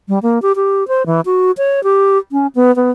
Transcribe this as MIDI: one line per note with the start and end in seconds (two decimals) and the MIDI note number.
0.08 0.19 55
0.23 0.41 58
0.42 0.53 67
0.56 0.87 67
0.88 1.06 72
1.06 1.21 52
1.26 1.52 66
1.57 1.83 73
1.84 2.18 67
2.32 2.47 61
2.55 2.74 59
2.76 2.91 59